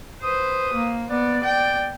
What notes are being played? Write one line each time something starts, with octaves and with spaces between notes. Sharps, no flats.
B4 C5 D#6
A#3
B3 D5
G5